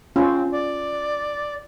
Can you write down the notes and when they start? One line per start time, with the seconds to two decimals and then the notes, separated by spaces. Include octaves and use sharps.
0.16 C4 C#4 F4
0.52 D5